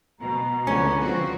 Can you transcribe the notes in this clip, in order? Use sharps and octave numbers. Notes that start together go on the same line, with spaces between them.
B2 A#5
C#2 D3 B3 C#4
F3 C4 F#4